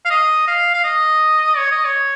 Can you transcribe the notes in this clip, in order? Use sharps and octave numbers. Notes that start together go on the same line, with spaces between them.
F5
D#5
F5
F5
D#5
C#5
D#5
C#5